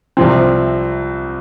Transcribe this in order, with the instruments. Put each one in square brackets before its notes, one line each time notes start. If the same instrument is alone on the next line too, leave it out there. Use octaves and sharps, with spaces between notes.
[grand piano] C2 C3 F3 C4